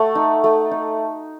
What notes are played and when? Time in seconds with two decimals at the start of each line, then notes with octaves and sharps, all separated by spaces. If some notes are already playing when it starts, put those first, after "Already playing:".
Already playing: A3 F#5
0.15 D#4
0.44 A3
0.71 D#4